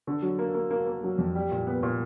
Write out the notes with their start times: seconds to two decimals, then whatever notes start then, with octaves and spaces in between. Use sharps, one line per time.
0.07 D3
0.22 F#3
0.39 A#3
0.54 A#3
0.71 A#3
0.86 A#3
1.04 F#3
1.18 F2
1.35 G3
1.51 A#2
1.67 B3
1.83 A#2